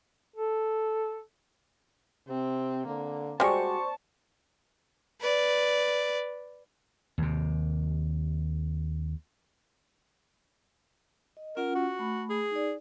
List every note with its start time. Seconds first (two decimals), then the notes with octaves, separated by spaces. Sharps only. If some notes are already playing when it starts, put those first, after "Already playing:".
0.36 A4
2.28 C3 C4
2.86 D3 A#3
3.40 G3 G#3 F#4 C5 D5 A5 C#6
5.20 B4 D5
7.18 D#2 C3
11.37 D#5
11.57 C#4 F4 A#4 F#5
11.75 F#4
11.99 A3 B5
12.30 G#4
12.51 D#4 D5